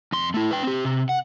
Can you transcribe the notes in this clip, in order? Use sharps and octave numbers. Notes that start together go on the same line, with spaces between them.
F2 C6
A3 E4
B4 G5
C4 G4
C3
F#5